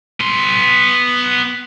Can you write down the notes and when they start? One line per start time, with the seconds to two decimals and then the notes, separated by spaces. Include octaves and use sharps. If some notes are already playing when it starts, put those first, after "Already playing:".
0.20 B3 C6